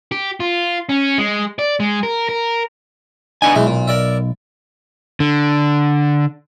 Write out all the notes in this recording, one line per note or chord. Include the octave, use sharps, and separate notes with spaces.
G4
F4
C#4
G#3
D5
G#3
A#4
A#4
B3 D4 D#4 G#5
B1 E3 G#3
A#2
A#4 D5 E5
D3